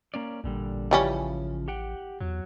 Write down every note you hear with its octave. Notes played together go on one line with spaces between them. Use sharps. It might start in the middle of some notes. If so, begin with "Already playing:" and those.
A#3 C#4 D5
A1 A#2 D3 G3
C#3 E3 F3 G3 C#4
G4 F#5 G5
E2 F#3